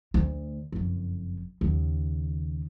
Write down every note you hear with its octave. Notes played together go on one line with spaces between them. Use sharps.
D2
F#1 F2
D#2 C#3